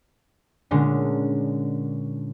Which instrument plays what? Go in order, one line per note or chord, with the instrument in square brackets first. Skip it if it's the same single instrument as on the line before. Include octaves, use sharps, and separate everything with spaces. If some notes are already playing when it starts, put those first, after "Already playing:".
[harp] A#2 D3 G#3 C#4 D4